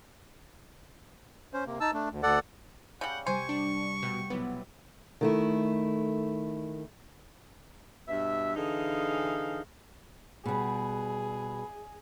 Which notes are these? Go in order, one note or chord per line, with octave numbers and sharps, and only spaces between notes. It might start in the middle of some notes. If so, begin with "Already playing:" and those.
C#4 C5
C3 A#3
D#4 A5 E6
A3 D4
D2
D2 A4 D5 F#5
C#3 G3 F#5 C#6 G6
C3 G3 C5 G#5 C#6
D4
B2 A3 F#5 G5
B1 B3 E4
D#3 A3 E4
G2 B2 E5
D3 E3 D#4 G#4 F5
B2 G3 G#4